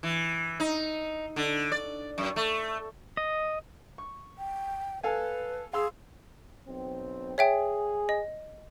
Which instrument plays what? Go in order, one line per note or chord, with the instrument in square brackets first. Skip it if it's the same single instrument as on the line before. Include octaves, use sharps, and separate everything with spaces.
[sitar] E3
D#4
D3
D5
F#2
A3
[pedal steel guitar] D#5
[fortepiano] C#6
[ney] G5
[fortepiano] A4 F5 G#5 [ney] B4
[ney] G#4 [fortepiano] F5 C6 E6
[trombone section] B1 C4
[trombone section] G#4 [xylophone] C#5 E5 G5
[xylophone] D#5